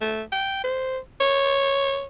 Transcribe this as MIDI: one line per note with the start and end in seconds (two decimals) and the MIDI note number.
0.01 0.23 57
0.32 0.61 79
0.64 0.98 72
1.21 2.05 73